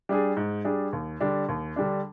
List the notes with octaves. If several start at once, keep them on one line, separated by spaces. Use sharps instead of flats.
G3 D4 G#4
G#2
G3 D4 G#4
D#2
D3 G3 D4
D#2
D3 G3 D4